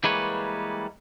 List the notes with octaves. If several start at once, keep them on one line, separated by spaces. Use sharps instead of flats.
E3 G3 G#3 A#3 B4 C#5